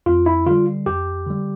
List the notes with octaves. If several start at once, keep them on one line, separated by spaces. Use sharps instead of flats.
F2 F4
E4
D3 G3 F4
F2 G4
D3 G3